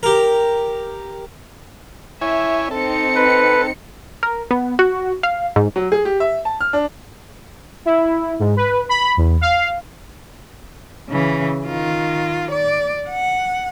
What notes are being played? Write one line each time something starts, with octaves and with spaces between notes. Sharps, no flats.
G4 A#4
E4 C#5 E5 G#5
C4 D#4 A4 C#7
B4
A#4
B3
F#4
F5
G#2
F#3
G#4
G4
E5
A5
F6
D4
E4
G#2
B4
B5
E2
F5
C#3 E3
D#3 F4
D5
F#5